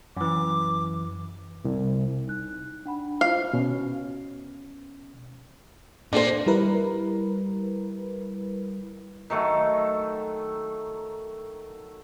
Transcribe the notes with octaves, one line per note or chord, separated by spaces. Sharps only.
F#2 E3 D6
C2
D#4 F#6
D4 F#5 B5
E4 F4 C5 F5
B2 C#4
A#2 A#3 D4 A4 C5
G3 E4 A#4 B4
D#3 F#3 A3 A4